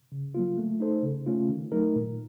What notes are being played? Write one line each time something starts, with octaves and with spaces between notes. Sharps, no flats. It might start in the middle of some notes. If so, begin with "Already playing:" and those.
C#3
F#3 A#3 F4
A3
D#4 A4 C5
C#3
A3 C#4 F4
D#3
F#3 A3 D#4 A#4
A#2